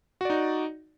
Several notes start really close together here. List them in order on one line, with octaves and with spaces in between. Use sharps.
F#4 D5 D#4